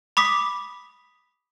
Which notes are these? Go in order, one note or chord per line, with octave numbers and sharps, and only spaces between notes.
B5 D6 D#6 B6